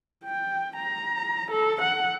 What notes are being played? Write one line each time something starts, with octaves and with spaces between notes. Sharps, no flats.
G5
A#5
A4
F#5